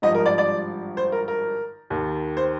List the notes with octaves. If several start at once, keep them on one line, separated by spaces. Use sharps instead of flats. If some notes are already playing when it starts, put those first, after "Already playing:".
G#1 G2 F3 D#5
A#4
D5
D5
C5
A#4
A#4
D#2 D#3
C5